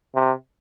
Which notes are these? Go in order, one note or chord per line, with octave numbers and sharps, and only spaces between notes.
C3